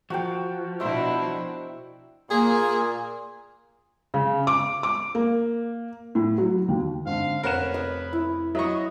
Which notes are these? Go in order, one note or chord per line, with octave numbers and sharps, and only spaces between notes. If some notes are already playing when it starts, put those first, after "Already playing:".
F3 F#4 A#4 G5
B2 D4 E4 C5 E5
A#2 A#3 G#4
C#3
D6
D6
A#3
A2
F#3
D#2
G#1 D3 F5
F1 A#4 B4 C#5 F#5 E7
D#6
E4
F#3 D#5 E5 C#6